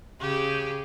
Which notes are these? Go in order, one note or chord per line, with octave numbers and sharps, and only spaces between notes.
C#3 G4 G#4